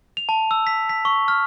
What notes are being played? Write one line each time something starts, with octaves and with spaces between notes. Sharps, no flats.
F7
A5
E6
B6
B6
C#6
F6